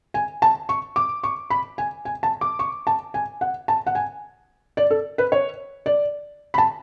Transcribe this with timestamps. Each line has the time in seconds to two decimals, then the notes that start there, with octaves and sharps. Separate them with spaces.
0.14 G#5
0.42 A5
0.69 C#6
0.96 D6
1.24 C#6
1.50 B5
1.78 G#5
2.05 G#5
2.23 A5
2.41 D6
2.59 C#6
2.87 A5
3.14 G#5
3.41 F#5
3.68 A5
3.87 F#5
3.95 G#5
4.77 D5
4.91 A4
5.18 B4
5.32 C#5
5.86 D5
6.54 B5
6.58 A5